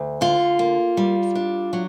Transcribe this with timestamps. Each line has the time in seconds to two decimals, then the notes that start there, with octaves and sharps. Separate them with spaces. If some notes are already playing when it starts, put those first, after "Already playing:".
Already playing: D2
0.21 D3 F4
0.59 A#3
0.97 G3
1.35 D4
1.73 F#3